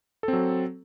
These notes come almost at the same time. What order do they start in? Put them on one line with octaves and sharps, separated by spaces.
A4 C4 F#3